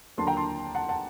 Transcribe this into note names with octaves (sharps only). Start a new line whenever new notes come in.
D#2 D3 F#3 A#3 D4 A5 C6
G5 A#5
A5 C6
F#5 A5
F#5 A5